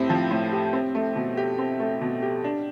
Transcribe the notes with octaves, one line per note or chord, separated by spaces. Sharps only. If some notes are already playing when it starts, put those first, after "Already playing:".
Already playing: A2 C4 G4
F3
A2
G4
C4
A3
B2
G4
C4
A3
B2
G4
D4